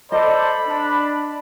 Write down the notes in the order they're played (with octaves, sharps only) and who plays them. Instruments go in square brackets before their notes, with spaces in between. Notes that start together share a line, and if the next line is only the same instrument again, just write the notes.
[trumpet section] A4 C5 D5 [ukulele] D#5 [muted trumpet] B5
[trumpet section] D4